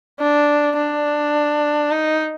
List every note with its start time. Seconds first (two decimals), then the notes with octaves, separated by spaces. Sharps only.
0.19 D4
0.77 D4
1.91 D#4